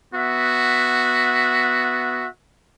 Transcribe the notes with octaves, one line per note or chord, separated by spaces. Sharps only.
B3 F#4 E5